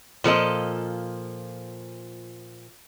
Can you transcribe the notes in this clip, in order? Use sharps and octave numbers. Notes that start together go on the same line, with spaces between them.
A#2 F3 A4 D#5